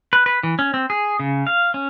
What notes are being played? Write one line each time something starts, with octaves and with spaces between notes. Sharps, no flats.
B4
B4
E3
C#4
C4
G#4
C#3
F5
C#4